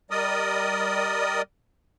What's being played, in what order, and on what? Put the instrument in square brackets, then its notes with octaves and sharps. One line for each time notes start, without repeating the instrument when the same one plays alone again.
[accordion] G3 A#4 D5 D#5 D#6